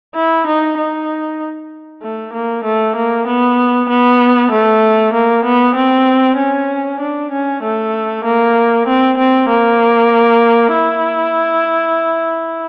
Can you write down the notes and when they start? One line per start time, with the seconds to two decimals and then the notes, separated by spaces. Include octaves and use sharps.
0.15 E4
0.47 D#4
0.78 D#4
2.03 A3
2.33 A#3
2.64 A3
2.96 A#3
3.27 B3
3.90 B3
4.52 A3
5.13 A#3
5.45 B3
5.76 C4
6.38 C#4
7.00 D4
7.31 C#4
7.63 A3
8.25 A#3
8.87 C4
9.18 C4
9.49 A#3
10.73 E4